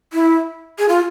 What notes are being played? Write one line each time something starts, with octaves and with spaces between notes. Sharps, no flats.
E4
G#4
F4